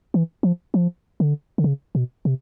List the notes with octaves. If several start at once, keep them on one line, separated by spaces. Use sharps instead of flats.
E3
F3
F3
D3
D3
C#3
B2
C3